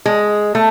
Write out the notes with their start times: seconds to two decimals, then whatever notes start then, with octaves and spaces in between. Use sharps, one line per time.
0.06 G#3
0.55 A3